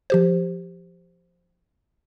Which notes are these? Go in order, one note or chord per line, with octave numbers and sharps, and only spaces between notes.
F3 G4 C5